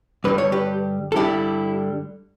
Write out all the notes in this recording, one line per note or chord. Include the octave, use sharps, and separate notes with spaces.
G2 D3 G3 B4
C#5
G4 B4
A4
G2 D3 G3 E4 G4